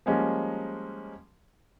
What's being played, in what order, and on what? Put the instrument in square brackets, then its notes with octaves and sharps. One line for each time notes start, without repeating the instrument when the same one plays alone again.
[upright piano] F3 G3 G#3 A#3 C#4